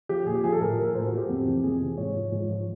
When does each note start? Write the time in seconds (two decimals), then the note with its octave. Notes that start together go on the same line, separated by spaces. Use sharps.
0.09 F3 G4
0.26 A#2 G#4
0.35 G4
0.44 F3 G#4
0.52 A4
0.61 A2 A#4
0.78 F3 A#4
0.95 A2 C5
1.06 F#4
1.12 F3
1.18 G4
1.29 F2
1.46 C3 E3
1.63 F2 G#4
1.81 C3 E3
1.97 G#2 C#5
2.15 F3
2.32 G#2
2.49 F3